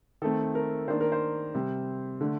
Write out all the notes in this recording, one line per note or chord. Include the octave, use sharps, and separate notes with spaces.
D#3 A3 C4 A4
A#4
D#3 A#3 D4 C5
A#4
C5
C3 G3 C4
D3 A3 D4